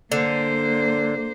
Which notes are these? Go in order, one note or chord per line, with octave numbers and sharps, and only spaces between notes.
D3 A#3 C5